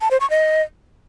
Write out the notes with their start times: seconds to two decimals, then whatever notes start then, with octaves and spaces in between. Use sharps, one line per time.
0.01 A5
0.11 C5
0.20 C#6
0.30 D#5